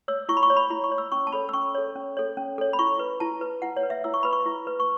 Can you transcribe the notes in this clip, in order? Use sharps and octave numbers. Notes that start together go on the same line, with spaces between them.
C#5 E6
E4 C#6
B5
C#6
C#5
B5
E4 B5
C#6
C#5
E6
C#4 C#6
A5
A4 C#5 B5
E6
C#4 C#6
A4 C#5
C#4
A4 C#5
C#4
A4 C#5
B5
E4 C#6
B4
E4 A5
B4
E4 F#5
C#5
B4
E5
E4 E6
C#6
B4 B5
C#6
E4
B4
C#6